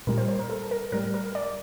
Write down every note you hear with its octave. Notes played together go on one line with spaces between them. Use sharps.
A#2 G3 A#4
C5
C5
A#4
A4
A#4
A2 G3 A#4
A#4
D5